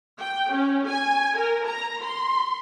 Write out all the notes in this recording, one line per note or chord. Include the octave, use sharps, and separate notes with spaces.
G5
C#4
G#5
A#4
A#5
C6